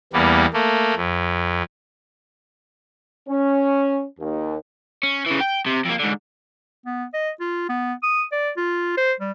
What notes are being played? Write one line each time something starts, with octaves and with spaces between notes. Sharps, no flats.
E2 G3 A#3 B3
A3 A#3
F2
C#4
D#2
C#4
C#3 E3
G5
C3
F2 A#3
G#2 D3
B3
D#5
F4
B3
D#6
D5
F4
C5
G3